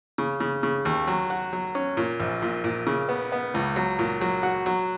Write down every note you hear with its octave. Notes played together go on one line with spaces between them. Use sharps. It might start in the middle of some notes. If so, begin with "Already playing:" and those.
C#3
C#3
C#3
D#2
F#3
F#4
F#3
C#4
A#2
A#1
A#2
A#2
C#3
B3
B3
C#2
F#3
A#2
F#3
F#4
F#3